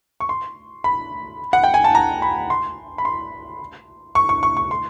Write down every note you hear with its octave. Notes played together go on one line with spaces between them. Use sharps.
C#6
C6
B5
F#5
G5
G#5
A5
A#5
B5
C6
B5
C6
C#6
C#6
C#6
C#6
C6